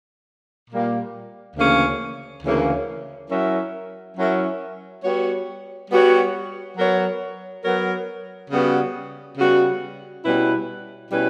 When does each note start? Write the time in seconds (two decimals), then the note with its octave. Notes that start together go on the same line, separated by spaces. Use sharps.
0.70 A#2 G3 A#3
1.56 D2 C#3 E3 A#3 C#4
2.43 D2 C#3 E3 A#3 C#4
3.30 F#3 C#4 E4 A#4 E5
4.17 F#3 C#4 E4 A#4 E5
5.04 G3 B3 F#4 C#5
5.91 G3 B3 F#4 C#5
6.77 F#3 B3 F#4 A#4 C#5
7.64 F#3 B3 F#4 A#4 C#5
8.50 C#3 G3 B3 F#4
9.38 C#3 G3 B3 F#4
10.24 B2 G3 C#4 E4 B4
11.11 B2 G3 C#4 E4 B4